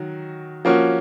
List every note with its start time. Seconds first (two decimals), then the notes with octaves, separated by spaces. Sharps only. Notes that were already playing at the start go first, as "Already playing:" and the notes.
Already playing: D#3 F#3 F#4
0.65 F3 A#3 C#4 F#4